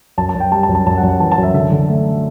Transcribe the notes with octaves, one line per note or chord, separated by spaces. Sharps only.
F#2 A5
A5
F#2
G5
G3 A5
A5
F#2
A5
F#2 A5
F#5
F#2
F#5
E3 A5
A5
F#2
E5
D3 E5
D3
A3